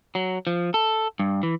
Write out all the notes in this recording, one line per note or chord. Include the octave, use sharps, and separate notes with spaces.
F#3
F3
A4
G2
E3